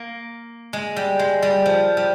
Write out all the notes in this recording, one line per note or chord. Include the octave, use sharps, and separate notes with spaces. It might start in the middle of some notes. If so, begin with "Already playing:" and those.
Already playing: A#3
G#3
G3
G#3
G3
F3
G3